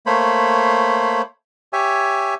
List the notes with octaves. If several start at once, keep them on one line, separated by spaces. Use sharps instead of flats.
A3 A#3 C5 C#5 B5
G4 C#5 E5 G#5